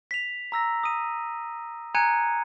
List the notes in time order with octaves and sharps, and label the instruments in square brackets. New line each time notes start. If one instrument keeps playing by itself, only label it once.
[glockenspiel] B6 F7
A#5 E6 A#6
D#6 D#7
G#5 A#5 F#6 G#6 C#7 D#7